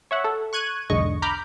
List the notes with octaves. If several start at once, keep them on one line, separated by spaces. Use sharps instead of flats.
C#5 E5 F#5
A4
C#6 F#6 G#6 D#7
B1 E2 G#2 D3 D#5 C#6
A#5 B5 D6 F6 G6